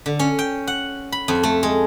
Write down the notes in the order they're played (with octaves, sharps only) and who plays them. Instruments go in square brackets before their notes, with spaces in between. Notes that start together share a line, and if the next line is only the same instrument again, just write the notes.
[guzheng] D3
C#4
G5
F#5
B5
F2
A3
G#3